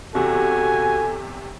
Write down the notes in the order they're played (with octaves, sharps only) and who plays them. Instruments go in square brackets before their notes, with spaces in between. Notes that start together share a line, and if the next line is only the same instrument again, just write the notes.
[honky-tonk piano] E2 C3 [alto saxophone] F#4 [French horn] A4 [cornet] G#5